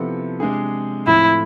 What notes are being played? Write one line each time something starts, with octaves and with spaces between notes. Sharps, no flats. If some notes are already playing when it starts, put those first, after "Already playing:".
Already playing: C3 F3 B3 E4 A4
C3 G#3 D4 G#4
A2 F3 A3 C4 E4